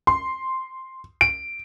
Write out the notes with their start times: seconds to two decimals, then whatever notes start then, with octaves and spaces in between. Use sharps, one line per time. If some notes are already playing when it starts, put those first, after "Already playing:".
0.07 C6
1.21 D7